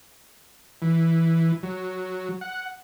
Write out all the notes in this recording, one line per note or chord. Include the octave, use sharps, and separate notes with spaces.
E3
F#3
F#5